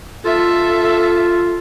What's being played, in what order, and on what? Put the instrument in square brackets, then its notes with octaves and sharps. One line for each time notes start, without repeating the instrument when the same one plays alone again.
[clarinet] F4 [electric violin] A4 E5